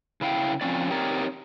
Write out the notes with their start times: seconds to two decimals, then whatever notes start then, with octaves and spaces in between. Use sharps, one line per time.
0.21 C#3 E4 F5 G5
0.61 F3 C4 C#4 D5
0.90 C4 D#4 G4 A#4 C#5 D5